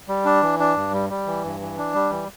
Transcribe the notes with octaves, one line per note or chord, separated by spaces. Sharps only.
G3
D4
E3
D4
G2
G3
G3
E3
G2
E3
D4
G3
E3